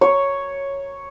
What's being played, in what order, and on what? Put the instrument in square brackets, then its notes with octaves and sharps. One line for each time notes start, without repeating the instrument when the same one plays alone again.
[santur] C#5